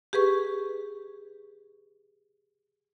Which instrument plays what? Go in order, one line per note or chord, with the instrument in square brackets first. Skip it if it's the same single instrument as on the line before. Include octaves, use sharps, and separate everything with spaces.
[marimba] G4 G#4 B4 C#6